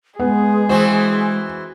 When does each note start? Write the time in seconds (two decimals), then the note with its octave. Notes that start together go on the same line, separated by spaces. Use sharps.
0.20 G#3 B3 G#4
0.69 E3 C4 F#4 C5